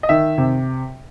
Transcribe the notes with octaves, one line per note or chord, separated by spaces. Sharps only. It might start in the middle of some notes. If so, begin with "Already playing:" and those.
D#5
D#3 E5
C3